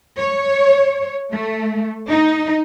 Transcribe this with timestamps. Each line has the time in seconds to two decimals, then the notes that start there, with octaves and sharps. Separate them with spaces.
0.18 C#5
1.32 A3
2.08 D#4